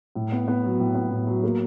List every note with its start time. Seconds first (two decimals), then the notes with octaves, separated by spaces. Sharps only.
0.15 A2
0.32 B3
0.48 B3
0.64 F#3
0.80 A2
0.95 B3
1.11 A2
1.27 F#3
1.44 A#3